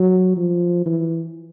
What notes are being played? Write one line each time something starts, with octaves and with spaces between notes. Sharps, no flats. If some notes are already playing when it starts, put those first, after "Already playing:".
Already playing: F#3
F3
E3